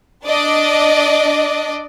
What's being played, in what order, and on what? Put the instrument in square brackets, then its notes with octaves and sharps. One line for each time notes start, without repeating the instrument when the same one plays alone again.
[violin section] D4 D5 D#5